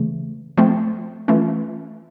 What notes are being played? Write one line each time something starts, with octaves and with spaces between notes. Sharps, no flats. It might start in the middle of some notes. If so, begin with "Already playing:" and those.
Already playing: C#3 E3 A3
F3 A3 C4
E3 A3 C#4 F4